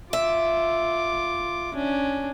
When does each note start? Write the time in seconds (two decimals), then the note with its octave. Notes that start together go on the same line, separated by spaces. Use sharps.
0.13 F4 E5 D6
1.74 C#4 D4